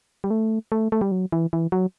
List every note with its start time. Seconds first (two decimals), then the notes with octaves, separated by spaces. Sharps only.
0.24 G3
0.30 A3
0.72 A3
0.92 A3
1.01 G3
1.11 F#3
1.32 E3
1.53 E3
1.72 F#3